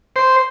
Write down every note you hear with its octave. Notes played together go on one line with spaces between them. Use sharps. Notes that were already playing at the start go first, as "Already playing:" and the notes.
C5